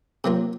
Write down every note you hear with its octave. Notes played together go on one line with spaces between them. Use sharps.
C3 F#3 A#3 F4